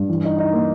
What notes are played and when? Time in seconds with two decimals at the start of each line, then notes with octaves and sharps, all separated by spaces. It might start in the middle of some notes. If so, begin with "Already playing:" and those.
Already playing: G2
0.09 E3
0.24 D#4
0.38 D#4
0.53 A#3